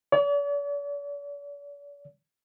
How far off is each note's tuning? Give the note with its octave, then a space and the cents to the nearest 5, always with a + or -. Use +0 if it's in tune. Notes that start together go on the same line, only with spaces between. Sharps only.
D5 -45